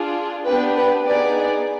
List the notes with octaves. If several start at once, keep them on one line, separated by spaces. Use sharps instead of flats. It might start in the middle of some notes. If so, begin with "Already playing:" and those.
Already playing: D4 F4 G#4
B3 D4 G4 B4
B4
B3 D#4 G#4 D5